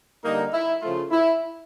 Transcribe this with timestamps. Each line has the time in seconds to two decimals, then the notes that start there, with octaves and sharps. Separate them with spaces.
0.24 D3 G3 A#3 D#4
0.53 E4
0.82 C#3 F3 A3 F4
1.11 E4